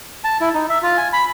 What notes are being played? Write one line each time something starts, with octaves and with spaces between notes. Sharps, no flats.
A5
E4
D#4
E5
F4
G#5
B5